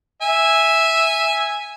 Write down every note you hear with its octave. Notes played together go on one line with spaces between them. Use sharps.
E5 G#5